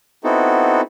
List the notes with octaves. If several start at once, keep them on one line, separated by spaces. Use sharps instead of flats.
B3 C4 D#4 E4 F#4 A4